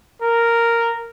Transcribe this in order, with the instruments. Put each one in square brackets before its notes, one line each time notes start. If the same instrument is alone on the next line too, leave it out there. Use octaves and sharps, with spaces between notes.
[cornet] A#4